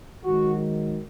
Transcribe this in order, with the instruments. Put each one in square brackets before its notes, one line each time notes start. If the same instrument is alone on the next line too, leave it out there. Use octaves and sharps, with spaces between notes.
[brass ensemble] G#2 D#3 F#3 F#4